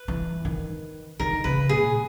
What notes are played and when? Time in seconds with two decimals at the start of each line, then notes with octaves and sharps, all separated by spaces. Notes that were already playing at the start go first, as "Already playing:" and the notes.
Already playing: B4
0.08 E3
0.45 D#3
1.19 D#3 A#4
1.44 C#3 B4
1.69 A#2 G#4